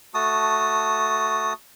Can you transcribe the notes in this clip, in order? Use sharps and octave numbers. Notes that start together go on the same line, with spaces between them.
A3 F#4 A5 D#6